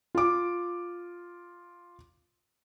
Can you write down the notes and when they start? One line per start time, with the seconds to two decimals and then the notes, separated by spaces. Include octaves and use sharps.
0.15 F4 D6